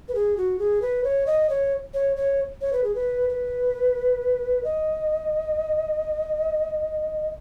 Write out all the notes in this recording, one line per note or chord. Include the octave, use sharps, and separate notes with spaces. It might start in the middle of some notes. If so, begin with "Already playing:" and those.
B4
G#4
F#4
G#4
B4
C#5
D#5
C#5
C#5
C#5
C#5
B4
G#4
B4
B4
D#5